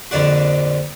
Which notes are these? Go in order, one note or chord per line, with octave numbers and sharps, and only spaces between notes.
A#1 F2 D3 D4 F#4